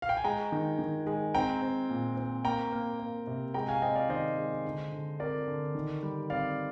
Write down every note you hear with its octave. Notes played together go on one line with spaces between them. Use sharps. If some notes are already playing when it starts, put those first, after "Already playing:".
F5
G5
G#5
G#3 G5 A#5
D#3
D#3
G#3
C4 G5 A#5
C4
A#2
C4
A#3 G5 A#5
A#3
A#3
C3
G#3 G5 A#5
F5 G#5
C4 D#5 G5
D5 F5
D#3 C5 D#5
G#3
D3
D3
C4 A#4 D5
D3
D#3
G3
C4 D5 F5